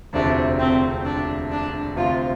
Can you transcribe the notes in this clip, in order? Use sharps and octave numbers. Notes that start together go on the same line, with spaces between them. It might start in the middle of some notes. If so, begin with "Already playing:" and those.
E1 D2 C3 F3 A3 D4
C4
D4
D4
D2 C3 F3 F4